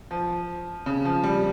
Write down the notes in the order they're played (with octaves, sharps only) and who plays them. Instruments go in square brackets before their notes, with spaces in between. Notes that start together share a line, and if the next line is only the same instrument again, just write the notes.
[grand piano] F3
C#3
F3
G3